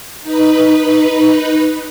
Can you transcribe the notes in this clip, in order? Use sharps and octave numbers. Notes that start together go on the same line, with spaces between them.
D#4 B4